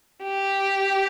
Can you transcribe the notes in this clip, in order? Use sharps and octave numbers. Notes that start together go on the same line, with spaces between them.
G4